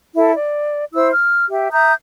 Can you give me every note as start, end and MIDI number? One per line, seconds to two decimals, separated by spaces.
0.15 0.33 64
0.15 0.33 69
0.34 0.84 74
0.93 1.10 64
0.93 1.10 72
0.93 1.10 88
1.12 1.44 89
1.49 1.71 67
1.49 1.71 76
1.72 1.92 76
1.72 1.92 82
1.72 1.92 87
1.72 1.92 91